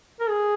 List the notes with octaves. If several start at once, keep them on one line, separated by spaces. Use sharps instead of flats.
A#4
G#4